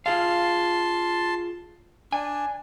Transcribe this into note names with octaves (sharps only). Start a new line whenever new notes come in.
F4 G#4 F5 A5 C6
D4 G#5